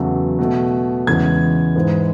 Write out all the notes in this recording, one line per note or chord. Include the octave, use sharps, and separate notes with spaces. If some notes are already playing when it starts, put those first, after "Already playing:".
Already playing: E2 C#3 F#3 A3
B2 A3
E2 C#3 E3 G#3 G#6
G#2 E3 G#3